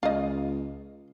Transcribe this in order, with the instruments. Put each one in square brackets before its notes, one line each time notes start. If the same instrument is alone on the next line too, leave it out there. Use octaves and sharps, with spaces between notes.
[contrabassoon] C#2 [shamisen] F4 D#5